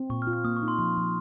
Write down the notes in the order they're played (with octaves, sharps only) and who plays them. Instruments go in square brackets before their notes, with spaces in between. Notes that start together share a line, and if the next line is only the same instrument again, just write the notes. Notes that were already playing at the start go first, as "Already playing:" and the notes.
Already playing: [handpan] C4
[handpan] A#2 [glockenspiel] C#6
[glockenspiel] F6
[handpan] F4
[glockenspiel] F6
[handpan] A#3 [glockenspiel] D#6
[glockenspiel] C#6
[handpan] D#4
[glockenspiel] C6
[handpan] F3 [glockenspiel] C6
[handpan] F3